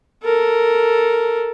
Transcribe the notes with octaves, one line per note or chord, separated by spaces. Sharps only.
A4 A#4